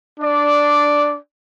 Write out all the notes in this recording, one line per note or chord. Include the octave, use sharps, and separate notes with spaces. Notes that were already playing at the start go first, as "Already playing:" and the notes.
D4 D5